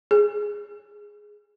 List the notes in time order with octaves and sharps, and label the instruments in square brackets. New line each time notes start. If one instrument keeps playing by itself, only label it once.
[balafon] G#4